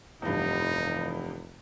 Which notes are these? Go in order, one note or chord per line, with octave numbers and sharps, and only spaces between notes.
F1 E2 G2 D#4